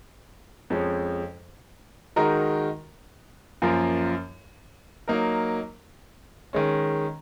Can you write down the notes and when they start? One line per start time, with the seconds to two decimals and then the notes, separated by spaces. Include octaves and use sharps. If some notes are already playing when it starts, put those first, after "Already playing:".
0.70 F2 F3 G#3 C#4
2.16 D#3 G#3 D#4 F#4 A#4
3.62 F#2 F3 A#3 F4 A#4
5.08 F#3 A#3 D#4 A#4
6.53 D#3 G#3 C#4